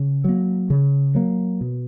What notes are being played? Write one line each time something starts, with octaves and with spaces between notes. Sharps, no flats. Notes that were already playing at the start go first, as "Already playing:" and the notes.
Already playing: C#3
F#3 A#3
C#3
F#3 A#3
B2